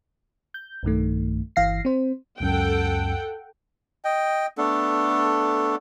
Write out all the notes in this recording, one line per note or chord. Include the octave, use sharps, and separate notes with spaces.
G6
B1 G2 D#3 A3
G1 E3 F5 A#6 C7
C4 C5
C#2 F#2 A4 F#5 G5
D#5 G5
A3 B3 D4 A4